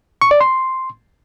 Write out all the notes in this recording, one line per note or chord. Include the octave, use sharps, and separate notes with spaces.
C#6
D5
C6